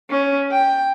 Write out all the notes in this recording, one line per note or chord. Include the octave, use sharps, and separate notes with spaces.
C#4
G5